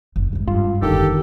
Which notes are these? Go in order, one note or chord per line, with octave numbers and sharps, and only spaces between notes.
F#1
F#1 G#2
G2 F4
F1 D3 D#3 G4 A4